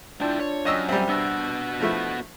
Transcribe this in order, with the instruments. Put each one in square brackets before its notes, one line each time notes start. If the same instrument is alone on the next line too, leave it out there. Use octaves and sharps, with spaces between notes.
[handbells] D4 F4 D5 [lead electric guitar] E4 G5
[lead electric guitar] C#5
[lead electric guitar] F#2 [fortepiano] C#5 D#5 E6
[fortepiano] G3 C4 [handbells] E5
[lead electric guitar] B3 F#4 [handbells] D4 E6 A#6
[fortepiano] F3 A3 E4